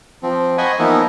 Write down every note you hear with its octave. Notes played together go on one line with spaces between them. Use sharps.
F3 C4
C5 D#5 F#5 G#5 B5 C#6
E3 F3 A#3 B3 D#4 E4